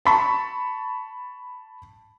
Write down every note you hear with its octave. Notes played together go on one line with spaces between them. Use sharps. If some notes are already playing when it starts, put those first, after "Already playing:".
A5 B5 C#6